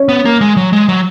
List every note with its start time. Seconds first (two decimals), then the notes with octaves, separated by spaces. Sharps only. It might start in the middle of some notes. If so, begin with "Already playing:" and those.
Already playing: C#4
0.09 B3
0.25 A#3
0.41 G#3
0.57 F#3
0.73 G#3
0.89 F#3